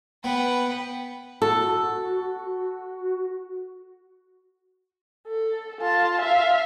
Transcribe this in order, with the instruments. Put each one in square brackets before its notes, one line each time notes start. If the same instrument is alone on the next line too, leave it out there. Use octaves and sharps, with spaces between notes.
[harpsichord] B3 [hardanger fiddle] B4 F#5 [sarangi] G5
[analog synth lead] F#4 [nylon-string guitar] A4
[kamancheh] A4
F4 A5
E5 F5